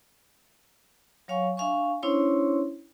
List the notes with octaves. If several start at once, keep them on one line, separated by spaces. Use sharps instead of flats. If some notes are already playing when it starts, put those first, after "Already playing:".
F#3 C#5 F5 G#5 C#6
D4 E5 F5 G#5 C#6
C#4 D4 E4 C5 C#5 C6